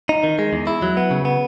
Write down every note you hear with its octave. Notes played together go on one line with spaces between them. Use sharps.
D#4
D#3
G#3
E2
E4
F#3
B3
C#3
B3